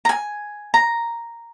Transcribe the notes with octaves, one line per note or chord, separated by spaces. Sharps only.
A#5
G#5
A#5